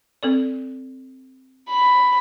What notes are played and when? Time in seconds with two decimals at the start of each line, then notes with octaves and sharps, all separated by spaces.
0.23 C4 A4 D5
1.70 B5